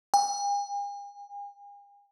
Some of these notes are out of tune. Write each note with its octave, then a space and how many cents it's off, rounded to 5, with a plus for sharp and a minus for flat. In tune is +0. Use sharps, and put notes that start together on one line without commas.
G#5 -45